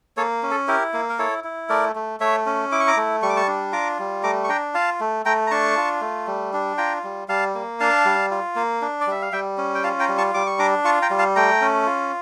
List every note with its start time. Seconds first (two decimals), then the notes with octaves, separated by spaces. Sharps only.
0.17 A#3 A4 C#5
0.43 C#4
0.51 A4
0.68 E4 G4 A#4
0.93 A#3
1.09 A#4
1.19 E4 A4 C#5
1.44 E4
1.69 A3 A#4 D5
1.96 A3
2.20 A3 C#5 E5
2.46 C#4
2.72 E4 D6
2.80 C#6
2.88 A#5 D6
2.97 A3
3.22 G3 C#6
3.29 D6
3.37 A5 C#6
3.47 D4
3.72 F4 A#5 D6
3.99 G3
4.23 A3 A#5 D6
4.44 C#6
4.49 D4 G5 A#5
4.74 F4 F5 A5
5.00 A3
5.25 A3 G5 A#5
5.47 A#5
5.51 D4 A5 C#6
5.77 F4
6.01 A3
6.27 G3
6.53 D4
6.78 F4 G5 A#5
7.04 G3
7.28 G3 F5 A5
7.55 A#3
7.80 D4 F5 A5
8.05 G3
8.31 F4
8.56 A#3
8.82 D4
9.01 D5
9.07 G3 E5
9.22 F5
9.32 G3 E5 G5
9.58 C#4
9.75 G5
9.84 F4 F5 A5
10.00 G5 A#5
10.09 G3
10.18 A5 C#6
10.34 G3 D6
10.46 C#6
10.59 D4 A#5 D6
10.84 F4 A5 C#6
11.02 G5 A#5
11.10 G3
11.19 F5 A5
11.36 A3 G5 A#5
11.61 C#4
11.86 F4